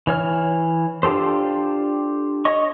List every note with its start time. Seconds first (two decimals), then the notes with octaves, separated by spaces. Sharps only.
0.07 E3 C#5 F6
1.03 D4 F4 G4 A4 C5
2.45 C#5 D#5 C#6